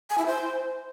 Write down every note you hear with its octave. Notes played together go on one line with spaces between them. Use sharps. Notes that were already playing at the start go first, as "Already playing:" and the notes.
G#5
E4
C5